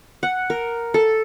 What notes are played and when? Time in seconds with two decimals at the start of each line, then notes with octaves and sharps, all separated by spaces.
0.23 F#5
0.50 A#4
0.94 A4